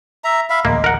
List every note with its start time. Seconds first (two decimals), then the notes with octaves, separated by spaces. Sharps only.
0.24 E5 A#5
0.50 E5 F5 B5
0.65 D1 A1 G#3 A#3
0.84 A#4 F#5